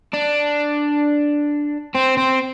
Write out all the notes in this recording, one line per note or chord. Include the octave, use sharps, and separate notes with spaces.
D4
C4
C4